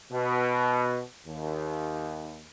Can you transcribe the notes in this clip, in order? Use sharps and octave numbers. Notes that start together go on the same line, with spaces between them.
B2
D#2